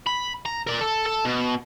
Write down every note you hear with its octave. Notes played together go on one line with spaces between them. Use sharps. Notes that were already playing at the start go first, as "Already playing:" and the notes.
B5
A#5
A#4 D5
A4
A4
B2